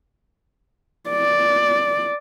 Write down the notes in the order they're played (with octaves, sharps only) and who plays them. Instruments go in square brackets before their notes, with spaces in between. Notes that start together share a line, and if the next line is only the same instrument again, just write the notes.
[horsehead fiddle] D5